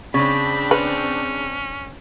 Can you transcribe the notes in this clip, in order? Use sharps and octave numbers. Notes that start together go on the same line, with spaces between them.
C#3 C4 D4 B5
C#4 B4